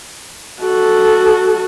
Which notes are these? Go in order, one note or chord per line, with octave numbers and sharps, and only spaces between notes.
F#4 A4